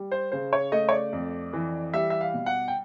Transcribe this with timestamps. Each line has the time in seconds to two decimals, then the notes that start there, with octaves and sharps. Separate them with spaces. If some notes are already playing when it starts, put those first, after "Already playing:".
Already playing: G3
0.11 C5
0.32 C#3 C5
0.53 C#5
0.72 A3 D#5
0.89 C#5
0.92 D5
1.13 F2
1.53 E3
1.94 G3 E5
2.10 E5
2.21 F5
2.34 B2
2.46 F#5
2.68 G5